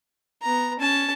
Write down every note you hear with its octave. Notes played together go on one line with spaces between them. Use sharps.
B3 A#5
C#4 A5